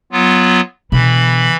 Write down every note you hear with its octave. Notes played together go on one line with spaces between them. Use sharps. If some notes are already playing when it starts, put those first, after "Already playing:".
F#3 B3 F4
B2 D3 E3 B5